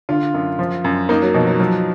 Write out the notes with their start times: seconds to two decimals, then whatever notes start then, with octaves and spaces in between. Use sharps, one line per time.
0.09 D3 F4
0.34 F#2
0.59 F3
0.84 F#2
1.09 A#3 D#4
1.22 F#3
1.34 B2 F3
1.47 F#3
1.60 F3 F#3